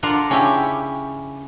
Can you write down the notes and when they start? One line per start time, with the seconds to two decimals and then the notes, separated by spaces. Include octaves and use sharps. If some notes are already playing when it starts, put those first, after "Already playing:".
0.03 D3 D4 F4 A#4 F5 F#5
0.30 C#3 C#4 D4 E4 G4